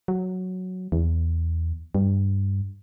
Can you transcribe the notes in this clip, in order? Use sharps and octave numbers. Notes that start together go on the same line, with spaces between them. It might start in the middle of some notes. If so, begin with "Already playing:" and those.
F#3
E2
G2